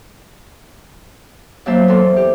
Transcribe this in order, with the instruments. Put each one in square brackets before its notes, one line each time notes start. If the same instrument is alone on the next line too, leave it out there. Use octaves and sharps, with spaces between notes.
[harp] F#2 F#3 A#3 C5 E5 A5
E2 A4 A5 C6
G4